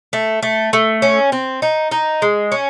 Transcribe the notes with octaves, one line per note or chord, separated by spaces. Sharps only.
A3
A3
A3
C#4
C4
D#4
D#4
G#3
C#4